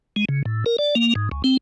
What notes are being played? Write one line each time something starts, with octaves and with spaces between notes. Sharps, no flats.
G#3
C#3
A2
A#4
D5
A#3
G#2
C#2
C4